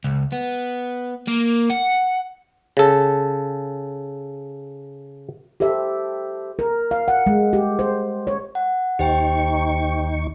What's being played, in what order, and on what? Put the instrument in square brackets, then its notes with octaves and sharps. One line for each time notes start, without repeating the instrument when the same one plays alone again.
[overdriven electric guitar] C#2
B3
A#3
F#5
[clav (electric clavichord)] C#3 A4
[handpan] G4 A4 C5 E5
A#4
F5
F#5
G#3
G4
C5
C#5
[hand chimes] F#5
[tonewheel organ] D#2 D#4 C#6 [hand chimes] G4 C5 G5